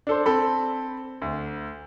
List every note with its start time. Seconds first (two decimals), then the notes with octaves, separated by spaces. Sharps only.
0.07 D4 A4 C5
0.26 C4 A4 B5
1.22 D2